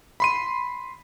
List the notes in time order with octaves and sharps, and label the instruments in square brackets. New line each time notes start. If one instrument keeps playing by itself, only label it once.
[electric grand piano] B5 C6 D#7